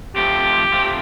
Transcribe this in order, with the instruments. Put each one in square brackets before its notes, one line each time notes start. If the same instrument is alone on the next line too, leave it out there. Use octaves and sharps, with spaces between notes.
[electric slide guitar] F3 A3 C4 [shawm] G4
[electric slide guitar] F3 A3 C4